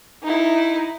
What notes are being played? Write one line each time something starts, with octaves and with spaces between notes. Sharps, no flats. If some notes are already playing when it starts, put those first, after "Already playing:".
D#4 E4